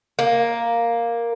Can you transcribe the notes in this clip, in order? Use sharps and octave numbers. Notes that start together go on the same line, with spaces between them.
A#3